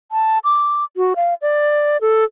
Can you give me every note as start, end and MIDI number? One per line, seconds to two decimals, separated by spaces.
0.12 0.39 81
0.44 0.84 86
0.97 1.13 66
1.16 1.34 77
1.42 1.97 74
2.01 2.24 69